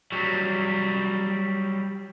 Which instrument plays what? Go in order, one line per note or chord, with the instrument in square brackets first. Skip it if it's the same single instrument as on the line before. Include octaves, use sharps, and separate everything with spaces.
[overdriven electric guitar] F#3 G3